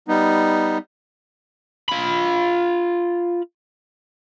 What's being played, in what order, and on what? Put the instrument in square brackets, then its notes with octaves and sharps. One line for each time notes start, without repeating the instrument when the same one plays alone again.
[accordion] G3 B3 D#4
[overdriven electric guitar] F4 B5